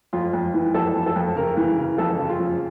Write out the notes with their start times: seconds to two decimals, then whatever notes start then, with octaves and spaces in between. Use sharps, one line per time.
0.13 F2 F4
0.33 F2
0.54 E3
0.74 F2 A4
0.95 F2
1.06 A4
1.16 F2
1.36 C#3 A#4
1.57 E3
1.78 C#3
1.98 F2 A4
2.19 C#3
2.29 F4
2.40 F2